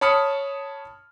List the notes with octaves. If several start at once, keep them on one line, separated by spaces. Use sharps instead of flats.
C#5 A5 B5 D#6 F6 C#7